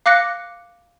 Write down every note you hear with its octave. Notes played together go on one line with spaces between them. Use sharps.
F5 D6 F#6 A#6 C#7